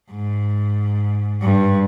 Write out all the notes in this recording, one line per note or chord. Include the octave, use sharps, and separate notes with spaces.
G#2
G2